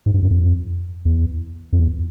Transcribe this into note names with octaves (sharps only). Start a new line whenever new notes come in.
G#2
G2
F#2
F2
E2
F2
E2